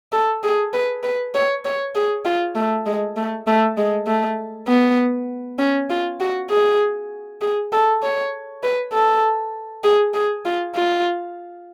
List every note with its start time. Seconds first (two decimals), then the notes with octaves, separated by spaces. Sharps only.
0.13 A4
0.43 G#4
0.73 B4
1.03 B4
1.34 C#5
1.65 C#5
1.95 G#4
2.25 F4
2.55 A3
2.86 G#3
3.16 A3
3.47 A3
3.77 G#3
4.07 A3
4.68 B3
5.59 C#4
5.90 F4
6.20 F#4
6.50 G#4
7.41 G#4
7.72 A4
8.02 C#5
8.63 B4
8.93 A4
9.84 G#4
10.14 G#4
10.45 F4
10.75 F4